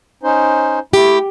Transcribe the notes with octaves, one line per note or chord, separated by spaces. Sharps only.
C#4 D#4 C5
A3 E4 G4